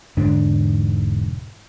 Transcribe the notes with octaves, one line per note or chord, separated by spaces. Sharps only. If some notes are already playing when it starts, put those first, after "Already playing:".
E1 G#2 D3 D4